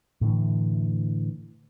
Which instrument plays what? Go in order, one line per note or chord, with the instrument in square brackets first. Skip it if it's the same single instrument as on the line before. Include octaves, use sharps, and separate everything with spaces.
[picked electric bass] A2 D3 E3